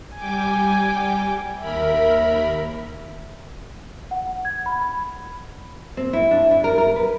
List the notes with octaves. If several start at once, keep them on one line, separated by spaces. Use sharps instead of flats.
G3 G5 G#5 D6
D#2 A#4 E5 B5
F#5
G#6
B5
C4
E4
D4
E4
A#4
A#4
B4